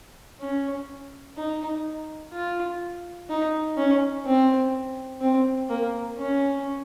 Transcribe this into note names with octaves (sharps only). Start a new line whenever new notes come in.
C#4
D#4
F4
D#4
C#4
C4
C4
A#3
C#4